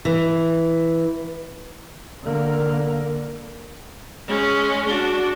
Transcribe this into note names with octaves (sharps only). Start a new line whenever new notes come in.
E3
D3 A#3
G#3 C#4
D4 F#4